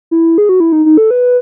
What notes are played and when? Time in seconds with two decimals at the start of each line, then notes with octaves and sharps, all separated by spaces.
0.11 E4
0.38 G#4
0.49 F#4
0.60 E4
0.72 D#4
0.86 D#4
0.97 A4
1.11 B4